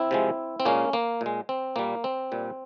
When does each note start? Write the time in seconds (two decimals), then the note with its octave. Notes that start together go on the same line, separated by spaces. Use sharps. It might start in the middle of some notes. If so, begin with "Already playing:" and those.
Already playing: C4 E4
0.11 C3 F3 G#3
0.60 C4
0.65 A#2 G#3 A#3 C#4
0.93 A#3
1.21 A#2 G#3
1.49 C4
1.76 A#2 G3 A#3
2.04 C4
2.32 A#2 G3